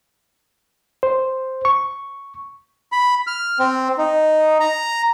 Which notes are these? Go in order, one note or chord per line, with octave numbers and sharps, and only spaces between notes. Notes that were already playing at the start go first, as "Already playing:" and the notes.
C5
C#6
B5
F6
C4
D#4
A#5